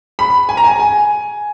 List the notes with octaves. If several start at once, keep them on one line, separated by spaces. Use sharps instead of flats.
B5
G#5
A#5
G#5
G#5